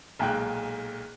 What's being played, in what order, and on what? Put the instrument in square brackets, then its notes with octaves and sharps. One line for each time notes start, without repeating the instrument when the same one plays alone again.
[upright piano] B1 A#2 G#3 G5 F#6